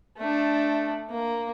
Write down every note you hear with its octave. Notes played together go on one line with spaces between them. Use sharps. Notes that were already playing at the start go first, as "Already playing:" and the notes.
A3 D4
A#3